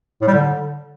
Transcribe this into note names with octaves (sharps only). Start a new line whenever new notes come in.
A2
G3
D3